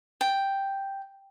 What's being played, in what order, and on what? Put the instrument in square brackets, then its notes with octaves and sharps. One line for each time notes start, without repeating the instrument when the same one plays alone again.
[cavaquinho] G5